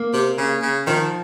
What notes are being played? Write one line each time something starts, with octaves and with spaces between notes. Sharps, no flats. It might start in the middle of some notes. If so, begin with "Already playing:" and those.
Already playing: A#3
C3
C#3
C#3
D#3 F3